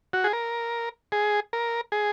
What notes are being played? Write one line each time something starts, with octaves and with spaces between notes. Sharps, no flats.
F#4
G#4
A#4
G#4
A#4
G#4